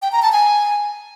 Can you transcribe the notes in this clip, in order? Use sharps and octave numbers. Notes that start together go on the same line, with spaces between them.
G5
A#5
A5
G#5